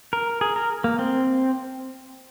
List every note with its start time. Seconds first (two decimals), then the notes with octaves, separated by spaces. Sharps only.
0.13 A#4
0.41 G#4
0.56 A#4
0.84 A#3
0.99 C4